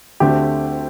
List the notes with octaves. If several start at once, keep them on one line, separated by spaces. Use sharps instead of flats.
D2 D3 A3 C4 G4